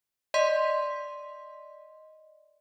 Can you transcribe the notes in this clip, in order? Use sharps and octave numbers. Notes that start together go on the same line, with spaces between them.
D5 D#5 C6 B6